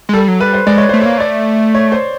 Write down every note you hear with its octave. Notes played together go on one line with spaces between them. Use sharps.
G#3
G3 A4
F#3
G3 B4
C5
G#3 D5
C#5
A3 C5
C#5
A#3
A3 D5
C#5
C5